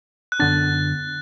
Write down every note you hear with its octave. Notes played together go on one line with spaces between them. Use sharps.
F#6
F#2 D3 B3 D4 A6